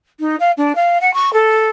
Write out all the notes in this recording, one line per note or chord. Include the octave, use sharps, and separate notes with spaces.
D#4
F5
D4
F5
F#5
C#6
A4